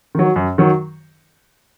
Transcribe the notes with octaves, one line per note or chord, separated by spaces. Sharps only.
D#3 F#3
F#2
D#3 F#3